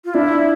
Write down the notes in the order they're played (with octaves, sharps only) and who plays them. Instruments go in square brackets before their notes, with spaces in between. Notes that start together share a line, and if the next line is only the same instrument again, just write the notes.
[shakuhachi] F4
[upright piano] D4 [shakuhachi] E4